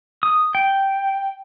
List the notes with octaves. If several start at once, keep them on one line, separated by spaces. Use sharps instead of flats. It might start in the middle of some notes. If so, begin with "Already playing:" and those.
D#6
G5